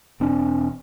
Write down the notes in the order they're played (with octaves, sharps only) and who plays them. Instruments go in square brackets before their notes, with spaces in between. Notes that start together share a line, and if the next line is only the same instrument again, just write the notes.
[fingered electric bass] E1 C4 D4